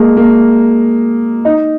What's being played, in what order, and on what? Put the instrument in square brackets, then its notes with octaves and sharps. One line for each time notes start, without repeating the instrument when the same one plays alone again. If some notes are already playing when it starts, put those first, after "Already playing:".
Already playing: [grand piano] G#3 A#3
A#3
D#4